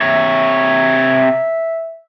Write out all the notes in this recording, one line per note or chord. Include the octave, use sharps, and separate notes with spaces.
C3 C#5 E5